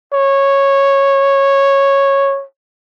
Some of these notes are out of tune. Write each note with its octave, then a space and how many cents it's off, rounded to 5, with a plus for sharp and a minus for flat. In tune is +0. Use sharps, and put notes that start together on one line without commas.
C#5 -10